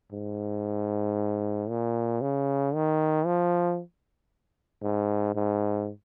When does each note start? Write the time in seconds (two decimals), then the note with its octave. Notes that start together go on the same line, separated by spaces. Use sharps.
0.12 G#2
1.69 A#2
2.21 C#3
2.74 D#3
3.26 F3
4.83 G#2
5.35 G#2